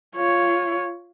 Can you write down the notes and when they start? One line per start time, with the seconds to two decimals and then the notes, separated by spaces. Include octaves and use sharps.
0.16 F4 C#5